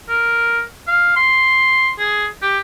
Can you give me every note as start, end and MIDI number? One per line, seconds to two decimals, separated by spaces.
0.09 0.61 70
0.87 1.14 77
1.16 1.91 84
1.99 2.26 68
2.42 2.59 67